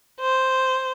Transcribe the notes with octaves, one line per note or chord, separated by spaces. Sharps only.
C5